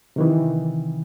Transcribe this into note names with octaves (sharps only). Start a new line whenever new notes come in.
C3 D#3 E3